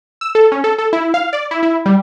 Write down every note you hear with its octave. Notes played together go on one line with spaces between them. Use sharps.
E6
A4
C#4
A4
A4
E4
F5
D5
E4
E4
G3